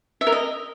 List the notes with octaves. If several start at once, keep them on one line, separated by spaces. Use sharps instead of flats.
E5
A#4
D#5